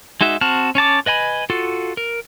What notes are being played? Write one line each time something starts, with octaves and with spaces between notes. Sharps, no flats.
G#3 D#4 F#4 E5
C4 F#4 A5 F6
C#4 C#5 A5 D6
B4 D#5 G#5 B5
F4 F#4 A4
A#4